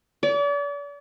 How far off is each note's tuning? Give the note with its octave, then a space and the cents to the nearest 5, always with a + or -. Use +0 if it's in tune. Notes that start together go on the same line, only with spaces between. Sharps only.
D5 -40